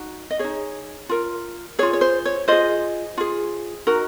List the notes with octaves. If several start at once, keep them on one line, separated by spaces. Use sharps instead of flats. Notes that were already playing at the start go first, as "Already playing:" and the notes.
Already playing: D#4 F#4
D#5
D#4 G#4 C#5
F4 A#4
F4 G#4 C#5
C#5
C5
C#5
F4 G#4 C5 D#5
F4 G#4
D#4 F#4 A#4